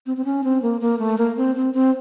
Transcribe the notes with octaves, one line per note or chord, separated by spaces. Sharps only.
C4
C4
C#4
C4
A#3
A#3
A3
A#3
C4
C4
C4